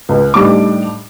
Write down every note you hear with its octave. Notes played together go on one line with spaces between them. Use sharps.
C#2
A2 G3 D4 D#4 D6